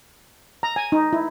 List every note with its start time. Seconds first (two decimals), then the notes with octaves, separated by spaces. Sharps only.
0.63 A#5
0.76 G#5
0.92 D#4
1.13 E4